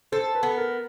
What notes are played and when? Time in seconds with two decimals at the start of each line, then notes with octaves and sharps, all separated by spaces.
0.12 A4 C5
0.35 B4
0.43 B3
0.57 A#4